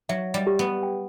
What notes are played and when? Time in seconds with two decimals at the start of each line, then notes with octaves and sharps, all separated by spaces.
0.09 F#3 E5
0.34 G3
0.47 G4
0.59 B3
0.83 G5